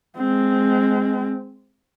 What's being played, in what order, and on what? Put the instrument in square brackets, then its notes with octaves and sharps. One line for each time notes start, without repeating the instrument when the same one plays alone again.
[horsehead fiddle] G#3 C4